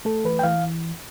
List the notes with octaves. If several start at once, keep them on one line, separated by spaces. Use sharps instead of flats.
A3 A4
E3 B4
G5
E3 F5